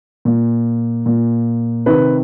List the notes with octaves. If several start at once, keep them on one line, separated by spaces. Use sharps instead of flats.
A#2
A#2
C3 D#3 B4